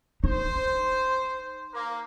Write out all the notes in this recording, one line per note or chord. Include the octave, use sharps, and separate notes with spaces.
D#4 C5
A#3